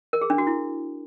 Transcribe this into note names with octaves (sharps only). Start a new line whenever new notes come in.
A#4
G#4
D4
F#4
E4